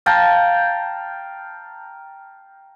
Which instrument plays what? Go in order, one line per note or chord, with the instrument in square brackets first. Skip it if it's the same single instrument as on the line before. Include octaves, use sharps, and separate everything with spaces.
[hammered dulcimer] F5 G5 A5 A#5